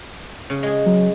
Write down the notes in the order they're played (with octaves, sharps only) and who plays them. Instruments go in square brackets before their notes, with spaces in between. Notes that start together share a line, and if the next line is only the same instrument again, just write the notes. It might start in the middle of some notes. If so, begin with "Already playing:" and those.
[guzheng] C#3
G#3 G#4
[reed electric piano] F#3